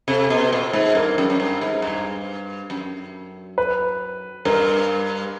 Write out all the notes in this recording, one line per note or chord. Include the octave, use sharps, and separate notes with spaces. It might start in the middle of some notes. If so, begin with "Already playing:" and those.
C3 A4
B2
A#2
G#2
G2 A#4
F#2
F#2
G2
G#2
G2
F#2
B4
G2 A#4